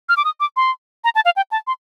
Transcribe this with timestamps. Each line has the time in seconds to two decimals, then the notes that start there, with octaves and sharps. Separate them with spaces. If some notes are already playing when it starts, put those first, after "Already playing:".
0.09 F6
0.17 D6
0.25 D#6
0.40 D6
0.57 C6
1.04 A#5
1.15 A5
1.25 F5
1.36 G5
1.51 A5
1.67 C6